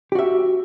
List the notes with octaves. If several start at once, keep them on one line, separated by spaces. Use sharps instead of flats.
F#4 G4 E5